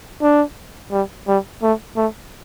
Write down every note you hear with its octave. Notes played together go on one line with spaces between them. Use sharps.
D4
G3
G3
A3
A3